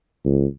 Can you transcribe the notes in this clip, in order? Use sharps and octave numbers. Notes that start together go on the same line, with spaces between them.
C#2